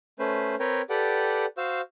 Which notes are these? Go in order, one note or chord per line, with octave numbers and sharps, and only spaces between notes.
A3 C#4 B4 C5
C4 A#4 B4 C#5 G5
G4 A4 B4 D5 F#5 G5
F#4 C5 F5 E6